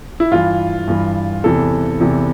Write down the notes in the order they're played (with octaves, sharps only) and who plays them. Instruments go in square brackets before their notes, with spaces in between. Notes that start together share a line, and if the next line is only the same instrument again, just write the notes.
[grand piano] E4
G2 E3 F4
G2 E3
E2 C3 E3 A4
E2 C3 E3